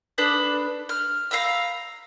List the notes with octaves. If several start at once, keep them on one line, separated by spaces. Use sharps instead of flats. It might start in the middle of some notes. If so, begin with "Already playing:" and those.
D4 A4 B4 D#6
F6
F5 A#5 B5 E6